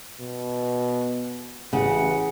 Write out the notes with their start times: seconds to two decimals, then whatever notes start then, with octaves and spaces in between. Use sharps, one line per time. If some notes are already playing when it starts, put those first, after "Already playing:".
0.21 B2
1.73 A1 C#3 F#5